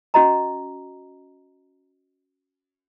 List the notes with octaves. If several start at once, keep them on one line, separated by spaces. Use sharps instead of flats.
C#4 F#4 D#5 A#5